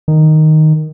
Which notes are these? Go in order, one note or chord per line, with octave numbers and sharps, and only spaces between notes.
D#3